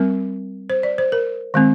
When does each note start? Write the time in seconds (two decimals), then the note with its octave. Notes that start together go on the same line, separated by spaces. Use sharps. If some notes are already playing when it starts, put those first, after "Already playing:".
Already playing: G3 C4 A#4
0.70 C5
0.83 D5
0.98 C5
1.12 A#4
1.54 D#3 G#3 C4